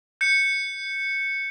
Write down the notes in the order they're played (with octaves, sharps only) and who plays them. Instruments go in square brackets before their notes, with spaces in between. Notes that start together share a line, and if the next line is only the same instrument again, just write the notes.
[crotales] G6 C#7